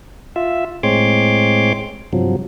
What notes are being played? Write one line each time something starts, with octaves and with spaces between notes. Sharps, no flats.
F4 E5
A2 G#3 C4 C#5 C6 D6
G2 C3 F3 F#3